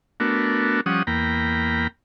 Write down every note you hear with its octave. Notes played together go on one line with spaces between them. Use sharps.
A3 B3 D4 F#4 A#4
F3 G3 C#4 F#5 D#6
E2 A#3 G5 A#5 B5